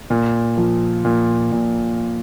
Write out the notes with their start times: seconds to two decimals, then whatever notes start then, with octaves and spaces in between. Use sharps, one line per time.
0.10 A#2
0.57 F3
1.05 A#2
1.52 A#2